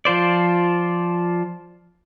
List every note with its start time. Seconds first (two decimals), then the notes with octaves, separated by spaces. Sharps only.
0.05 F3 F4 C5 D5